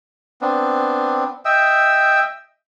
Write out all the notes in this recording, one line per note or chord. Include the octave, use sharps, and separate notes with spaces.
B3 C4 D4
D#5 E5 G5 E6